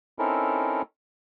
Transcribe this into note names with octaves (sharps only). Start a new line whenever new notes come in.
C4 C#4 D#4 E4 A4 A#4